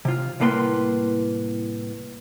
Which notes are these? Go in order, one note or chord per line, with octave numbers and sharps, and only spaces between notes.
C3 F4
C2 A2 A#3 B4 A#5 C6